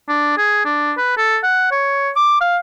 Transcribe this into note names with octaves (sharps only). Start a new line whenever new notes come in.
D4
G#4
D4
B4
A4
F#5
C#5
D6
F5